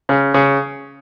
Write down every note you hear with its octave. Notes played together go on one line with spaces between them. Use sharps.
C#3
C#3